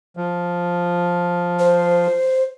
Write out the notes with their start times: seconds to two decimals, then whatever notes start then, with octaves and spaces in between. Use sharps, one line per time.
0.17 F3
1.59 C5